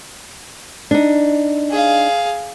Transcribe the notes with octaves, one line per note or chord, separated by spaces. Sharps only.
D4 D#4
G#4 F5